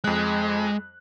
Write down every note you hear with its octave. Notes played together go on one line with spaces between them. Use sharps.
F2 G#3 F#6